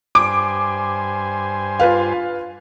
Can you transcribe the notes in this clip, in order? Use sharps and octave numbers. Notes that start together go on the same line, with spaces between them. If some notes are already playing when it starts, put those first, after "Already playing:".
G2 C5 G#5 D6
F4 B4 F5